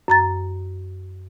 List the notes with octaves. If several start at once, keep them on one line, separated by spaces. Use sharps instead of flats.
F#2 A#5 A6